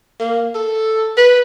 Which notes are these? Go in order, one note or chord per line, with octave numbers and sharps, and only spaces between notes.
A#3
A4
B4